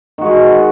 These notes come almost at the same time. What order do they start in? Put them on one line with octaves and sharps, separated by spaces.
D#3 F#4 G#3